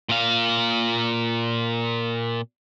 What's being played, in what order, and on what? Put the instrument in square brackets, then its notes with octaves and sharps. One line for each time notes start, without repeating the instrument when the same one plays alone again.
[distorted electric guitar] A#2 F5